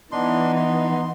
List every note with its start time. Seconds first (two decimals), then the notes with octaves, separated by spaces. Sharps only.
0.12 E3 B3 D4 D#4 C6
0.56 C6